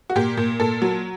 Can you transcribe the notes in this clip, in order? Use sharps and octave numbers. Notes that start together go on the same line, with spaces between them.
F#4
A#2 G4
A#2
A#2 A4
F#3